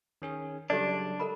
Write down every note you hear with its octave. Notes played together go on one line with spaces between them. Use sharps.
D#3 C#4 G#4
C#3 F#3 G3 D4 G4 A4 D5
A4 A#4 B5